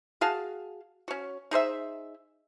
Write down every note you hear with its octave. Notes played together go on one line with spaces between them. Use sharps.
F#4 G#4 F5 A5
C#4 F#4
D#4 G#4 C5 E5